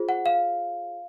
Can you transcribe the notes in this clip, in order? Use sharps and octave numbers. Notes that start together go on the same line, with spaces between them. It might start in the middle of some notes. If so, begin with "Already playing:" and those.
Already playing: F4 G#4 C5
F#5
F5